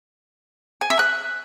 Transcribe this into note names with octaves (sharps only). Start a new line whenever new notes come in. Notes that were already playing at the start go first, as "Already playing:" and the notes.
G#5
E5
F#6